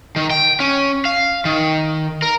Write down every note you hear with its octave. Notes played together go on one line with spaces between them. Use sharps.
D#3
G5
C#4
F5
D#3
A#4